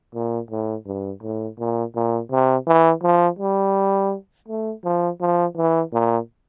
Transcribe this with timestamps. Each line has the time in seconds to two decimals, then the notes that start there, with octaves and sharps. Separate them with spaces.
0.14 A#2
0.51 A2
0.86 G2
1.23 A2
1.59 A#2
1.95 A#2
2.31 C3
2.67 E3
3.03 F3
3.39 G3
4.48 A3
4.84 F3
5.21 F3
5.57 E3
5.93 A#2